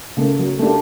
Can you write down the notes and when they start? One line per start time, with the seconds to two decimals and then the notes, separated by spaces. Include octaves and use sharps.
0.17 C#3 A3 A#3
0.39 F#3
0.59 A3 A#3 D4 G4